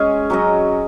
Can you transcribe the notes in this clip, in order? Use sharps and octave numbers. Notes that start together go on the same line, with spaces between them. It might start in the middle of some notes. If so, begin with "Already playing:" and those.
Already playing: G#3 C#4 G#4 C#5
F#3 C#4 F#4 D#5